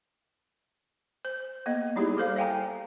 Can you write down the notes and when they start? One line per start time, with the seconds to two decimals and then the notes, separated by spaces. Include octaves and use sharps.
1.25 C5
1.66 A#3 B3 D#5
1.96 G3 D#4 E4 G4 G#4
2.17 G3 A4 C5 F5
2.36 E5 F5 G5 G#5 A#5